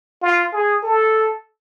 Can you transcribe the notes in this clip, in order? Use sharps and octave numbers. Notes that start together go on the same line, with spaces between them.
F4
G#4
A4